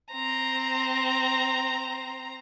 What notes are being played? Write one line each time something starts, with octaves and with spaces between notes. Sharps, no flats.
C4 A#5